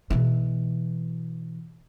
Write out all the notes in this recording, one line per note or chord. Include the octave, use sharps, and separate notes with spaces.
B2 E3